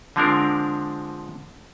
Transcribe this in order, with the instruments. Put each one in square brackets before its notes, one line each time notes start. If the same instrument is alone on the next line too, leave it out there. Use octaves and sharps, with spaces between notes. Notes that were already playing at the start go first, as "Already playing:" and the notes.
[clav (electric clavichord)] D3 F3 G#3 C4 D4 A#4